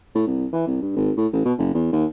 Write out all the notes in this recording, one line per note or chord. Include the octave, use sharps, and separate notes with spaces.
A2
C2
E3
C2
G2
G#1
A2
A1
B2
F#1
E2
D#2